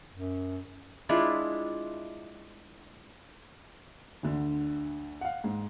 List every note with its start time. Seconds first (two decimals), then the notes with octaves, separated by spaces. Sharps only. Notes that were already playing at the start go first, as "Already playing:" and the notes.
0.12 F#2
1.09 G#3 D4 E4 F4
4.23 D2 D3
5.21 F5 F#5
5.44 G#2